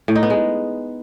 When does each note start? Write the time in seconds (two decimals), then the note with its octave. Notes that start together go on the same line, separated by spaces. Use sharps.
0.08 A2
0.15 D#4
0.23 B3
0.30 G#3